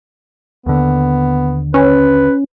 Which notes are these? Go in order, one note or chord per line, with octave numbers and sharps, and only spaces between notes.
D#2 D3 B3
C#4 B4